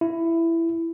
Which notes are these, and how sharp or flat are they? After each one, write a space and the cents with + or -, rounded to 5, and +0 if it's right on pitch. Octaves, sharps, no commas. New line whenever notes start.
E4 +10